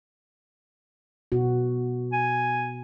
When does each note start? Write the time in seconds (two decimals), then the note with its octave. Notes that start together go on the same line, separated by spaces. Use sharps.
1.32 B2 B3 F#4
2.12 G#5